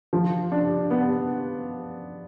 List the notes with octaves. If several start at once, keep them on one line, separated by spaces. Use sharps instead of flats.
F3
D4
B3